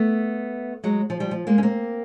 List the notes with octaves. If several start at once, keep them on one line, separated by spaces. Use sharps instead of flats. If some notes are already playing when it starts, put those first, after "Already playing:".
Already playing: A3 B3
F#3 G#3
F3
F3 G3
F3
G#3 A#3
C#4
A#3 C4